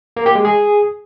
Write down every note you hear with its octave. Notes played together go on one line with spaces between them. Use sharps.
A#3
G4
G#3
G#4